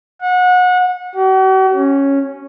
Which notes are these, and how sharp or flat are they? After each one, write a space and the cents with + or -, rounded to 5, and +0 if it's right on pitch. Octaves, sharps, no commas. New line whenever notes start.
F#5 -30
F#4 +45
C#4 -5